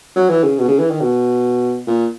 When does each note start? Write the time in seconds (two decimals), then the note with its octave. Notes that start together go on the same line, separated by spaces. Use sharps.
0.16 F#3
0.30 E3
0.44 C#3
0.58 B2
0.68 C#3
0.79 E3
0.91 D#3
1.01 B2
1.87 A#2